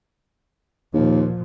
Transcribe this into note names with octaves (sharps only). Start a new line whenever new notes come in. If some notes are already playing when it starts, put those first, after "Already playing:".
D#2 A#2 F3